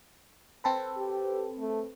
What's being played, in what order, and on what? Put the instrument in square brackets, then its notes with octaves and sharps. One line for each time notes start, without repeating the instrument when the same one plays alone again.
[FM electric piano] C4 A4 B4
[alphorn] G4
A3